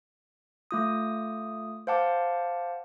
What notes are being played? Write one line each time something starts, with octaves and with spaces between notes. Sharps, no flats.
A3 F4 D#6
C5 F5 F#5 A5 D6